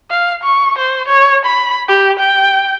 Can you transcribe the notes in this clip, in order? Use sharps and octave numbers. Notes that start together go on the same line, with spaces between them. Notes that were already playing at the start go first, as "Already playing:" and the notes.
F5
C#6
C5
C#5
B5
G4
G5